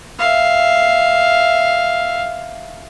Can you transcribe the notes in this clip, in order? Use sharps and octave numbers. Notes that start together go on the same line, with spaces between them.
E5 F5